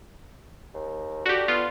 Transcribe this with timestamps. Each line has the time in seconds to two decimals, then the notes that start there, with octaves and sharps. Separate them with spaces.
0.74 D#2
1.26 D3 F#4 G4
1.48 B3 F4